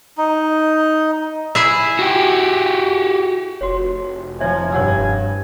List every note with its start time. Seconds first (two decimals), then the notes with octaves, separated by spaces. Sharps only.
0.18 D#4
1.55 E4 G#4 E5
1.99 F#4 G4
3.61 F1 F#4 C#5
4.40 F3 E4 C#5 E5 G#5
4.72 G2 C#5 F#5 E6